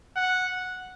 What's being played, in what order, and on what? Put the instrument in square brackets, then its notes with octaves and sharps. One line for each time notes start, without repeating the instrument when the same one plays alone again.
[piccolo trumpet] F#5